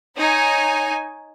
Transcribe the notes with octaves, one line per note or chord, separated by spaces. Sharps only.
D#4 C#5 G#5